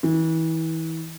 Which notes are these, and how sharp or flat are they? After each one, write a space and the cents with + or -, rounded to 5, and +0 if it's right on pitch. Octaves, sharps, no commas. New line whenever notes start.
E3 -30